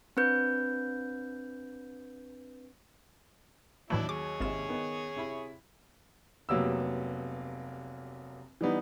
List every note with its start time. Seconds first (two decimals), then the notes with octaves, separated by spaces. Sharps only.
0.17 C4 D4 B4 G6
3.90 D#2 A2 E3 F#3 A3 D4 E4
4.09 G#4 C#5 D6
4.41 G#1 D#2 G#2 C3 F4 E7
4.69 D#3 B3 B4
5.16 C3 E4 B5
6.49 F1 F#3 A#3 B3 G4 E6
8.61 E3 G3 B3 D#4